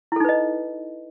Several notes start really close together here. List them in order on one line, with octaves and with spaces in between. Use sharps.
E4 A4 D#4 B4 D#5